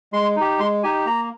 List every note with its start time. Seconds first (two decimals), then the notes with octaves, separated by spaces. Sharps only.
0.13 G#3 C6
0.36 D#4 G4
0.59 G#3 C6
0.83 D#4 G4 G#5
1.06 A#3 A#5